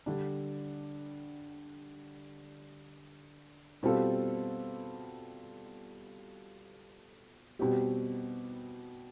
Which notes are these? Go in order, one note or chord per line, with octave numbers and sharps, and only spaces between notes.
D3 G3 D4
B2 G3 C4 F4 A4
B2 G3 C4 G4